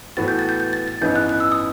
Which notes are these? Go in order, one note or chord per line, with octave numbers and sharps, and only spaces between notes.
A2 E3 B3 F#4 A6
G6
A6
G6
G6
A6
A6
A1 G2 E3 B3 D#4 G6
F#6
F#6
E6
D#6